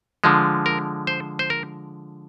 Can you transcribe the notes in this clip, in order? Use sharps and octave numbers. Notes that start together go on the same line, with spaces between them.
D3 F3 G#3
A#4
C5
C5
A#4